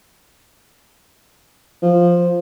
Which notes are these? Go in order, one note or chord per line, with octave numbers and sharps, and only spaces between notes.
F3